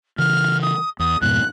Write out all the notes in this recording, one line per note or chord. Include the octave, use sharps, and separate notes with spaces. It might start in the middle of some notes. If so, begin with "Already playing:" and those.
C#3 E3 F6
D#6
E2 D#6
F2 G#2 B2 F#6